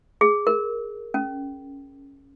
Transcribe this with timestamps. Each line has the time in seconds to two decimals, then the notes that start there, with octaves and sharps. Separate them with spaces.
0.21 G#4
0.47 A#4
1.14 C#4